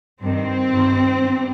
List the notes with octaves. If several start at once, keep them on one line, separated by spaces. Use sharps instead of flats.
G2 D#3 C4
G2 D#3
G2